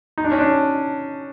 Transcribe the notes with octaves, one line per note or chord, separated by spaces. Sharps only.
D#4
D4
C#4
D4